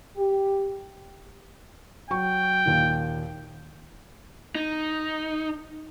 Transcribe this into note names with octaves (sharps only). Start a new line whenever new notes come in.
G4
F#3 G5 C#6
D#2 A#2 D#3
D#4